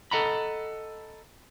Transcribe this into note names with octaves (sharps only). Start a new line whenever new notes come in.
A4 D#5 F#5 A#5 B5